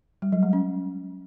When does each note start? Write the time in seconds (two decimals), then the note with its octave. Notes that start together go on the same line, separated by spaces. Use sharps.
0.22 G3
0.32 F#3
0.43 G#3
0.53 C#4